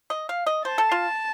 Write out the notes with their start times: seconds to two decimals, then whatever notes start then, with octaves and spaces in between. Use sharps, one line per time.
0.10 D#5
0.29 F5
0.46 D#5
0.65 C5 A5
0.78 A4
0.91 F4